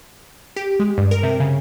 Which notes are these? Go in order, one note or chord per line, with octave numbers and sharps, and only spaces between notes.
G4
G#3
G2
A#4
C3
C#3